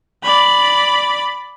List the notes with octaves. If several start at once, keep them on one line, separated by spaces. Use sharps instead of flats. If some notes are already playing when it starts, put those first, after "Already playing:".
D5 B5